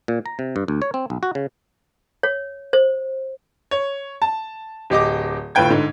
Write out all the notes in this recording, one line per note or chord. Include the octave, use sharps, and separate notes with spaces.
A#2
A#5
C3
G2
D2
C#5
C4
B1
F#4
C#3
C#5
C5
C#5
A5
D1 G4 D#5 D6
G1 A2 F4 B4 G5 G#6
G#2 D3